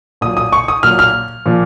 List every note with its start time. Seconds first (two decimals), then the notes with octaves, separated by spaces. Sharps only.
0.21 A#2 D#6
0.26 F#3
0.37 D#6
0.52 C#6
0.68 D#6
0.83 A#2 F#3 F6
0.99 F6
1.46 A#2 F3